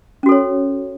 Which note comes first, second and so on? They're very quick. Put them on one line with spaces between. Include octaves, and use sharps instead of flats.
C#4 F#4 A4 C#5